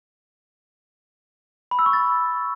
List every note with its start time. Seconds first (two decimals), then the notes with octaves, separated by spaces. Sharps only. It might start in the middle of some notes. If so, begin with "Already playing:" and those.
1.71 B5
1.79 E6
1.86 C#6
1.93 A6